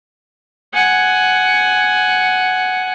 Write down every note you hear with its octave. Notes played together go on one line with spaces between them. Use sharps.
F#5 G#5